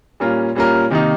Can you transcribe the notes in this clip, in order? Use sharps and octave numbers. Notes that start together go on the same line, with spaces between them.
A#2 G3 C#4 F4 A#4
A#2 G3 C#4 F4 A#4
C3 D#3 A#3 D#4